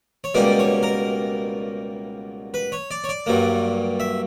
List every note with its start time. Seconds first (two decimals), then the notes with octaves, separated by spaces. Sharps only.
0.24 C#5
0.35 C#2 B2 G3 A#3 D5
0.59 C#5
0.83 A#4
2.54 B4
2.72 C#5
2.91 D5
3.04 C#5
3.09 D5
3.26 G2 F#3 A#3
4.00 E5